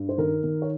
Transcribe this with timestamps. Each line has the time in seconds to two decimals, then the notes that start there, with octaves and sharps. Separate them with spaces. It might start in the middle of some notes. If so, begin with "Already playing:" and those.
Already playing: G2
0.09 C5
0.18 D#3 A#4
0.44 D#3
0.62 C#5